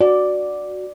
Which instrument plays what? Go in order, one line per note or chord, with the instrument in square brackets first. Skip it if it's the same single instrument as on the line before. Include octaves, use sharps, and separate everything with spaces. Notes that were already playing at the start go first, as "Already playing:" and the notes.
[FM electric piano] F#4 [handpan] D5